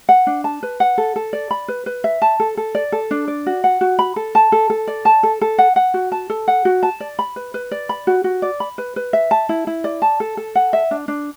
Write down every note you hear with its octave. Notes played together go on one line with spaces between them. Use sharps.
F#5
D4
A5
B4
F#5
A4
A4
D5
B5
B4
B4
E5
A5
A4
A4
D5
A4
D4
D5
F#4
F#5
F#4
B5
A4
A5
A4
A4
D5
A5
A4
A4
F#5
F#5
F#4
A5
A4
F#5
F#4
A5
D5
B5
B4
B4
D5
B5
F#4
F#4
D5
B5
B4
B4
E5
A5
E4
E4
D5
A5
A4
A4
F#5
E5
D4
D4